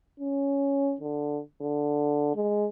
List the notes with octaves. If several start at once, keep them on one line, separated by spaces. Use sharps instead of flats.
C#4
D3
D3
G#3